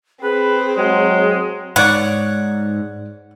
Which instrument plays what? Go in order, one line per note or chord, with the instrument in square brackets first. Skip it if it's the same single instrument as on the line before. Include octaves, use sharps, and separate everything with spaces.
[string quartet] C4 [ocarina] G#4 [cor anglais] B4
[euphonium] F#3 [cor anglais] G#3
[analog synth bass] G#2 [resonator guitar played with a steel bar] C#5 D5 [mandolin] F#5